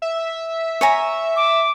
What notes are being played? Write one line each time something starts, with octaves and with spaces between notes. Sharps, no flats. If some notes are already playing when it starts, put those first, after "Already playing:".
E5
C#5 G#5 A#5
D6